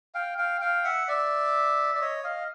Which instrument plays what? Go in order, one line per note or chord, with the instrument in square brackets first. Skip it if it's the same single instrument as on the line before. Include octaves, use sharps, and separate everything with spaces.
[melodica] F5 G5
F5 G5
F5 G5
E5 F#5
D5 E5
D5
C#5 D#5
D#5 F5